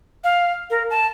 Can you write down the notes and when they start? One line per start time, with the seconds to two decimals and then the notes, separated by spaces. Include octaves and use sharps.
0.24 F5
0.70 A#4
0.90 A5